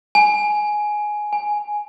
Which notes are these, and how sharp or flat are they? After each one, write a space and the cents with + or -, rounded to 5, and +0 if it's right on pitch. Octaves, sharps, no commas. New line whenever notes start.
G#5 +10
G#5 +0